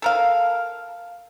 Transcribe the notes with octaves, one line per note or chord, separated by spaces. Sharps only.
A4 A#4 F5